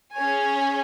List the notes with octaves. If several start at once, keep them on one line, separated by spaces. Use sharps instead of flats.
C#4 G#4 C#5 G#5